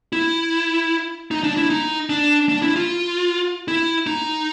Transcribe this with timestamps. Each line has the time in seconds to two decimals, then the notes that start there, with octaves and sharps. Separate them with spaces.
0.13 E4
1.31 D#4
1.44 D4
1.57 E4
1.70 D#4
2.09 D4
2.49 D4
2.62 E4
2.76 F4
3.68 E4
4.07 D#4